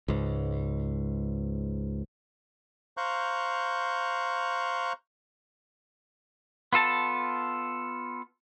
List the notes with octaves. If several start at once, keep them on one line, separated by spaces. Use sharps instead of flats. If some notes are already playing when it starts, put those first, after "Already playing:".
C#2 G#2
C5 F5 A#5 C#6 F#6 G6
B3 F4 A4 A5